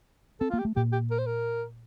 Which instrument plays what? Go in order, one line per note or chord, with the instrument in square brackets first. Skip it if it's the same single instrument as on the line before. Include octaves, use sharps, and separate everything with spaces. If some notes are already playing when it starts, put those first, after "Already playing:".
[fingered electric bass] C4 [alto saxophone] A4
[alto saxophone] F4
[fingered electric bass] A#3
[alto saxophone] G4
[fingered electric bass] A3
[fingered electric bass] A#2 A#3 [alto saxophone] G4
[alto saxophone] G4
A#4
C5
A#4